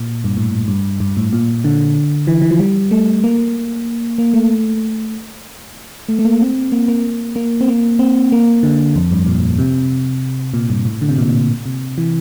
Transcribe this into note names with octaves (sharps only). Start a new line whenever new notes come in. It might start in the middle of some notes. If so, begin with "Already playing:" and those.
Already playing: A#2
G2
A2
G2
G2
A2
A#2
D3
E3
E3
F3
G3
A3
A#3
A#3
A3
A3
A3
A#3
C4
A#3
A#3
A#3
C4
A#3
C4
A#3
D3
F2
G2
A#2
C3
A#2
G2
A2
D3
C3
A#2
C3
E3